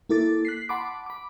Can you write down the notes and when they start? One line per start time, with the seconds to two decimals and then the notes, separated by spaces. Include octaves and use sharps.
0.09 A#3 E4 A4 D6 A6
0.45 F#6 B6 C7
0.69 F#5 A5 B5 C6 D6
1.06 B5 D6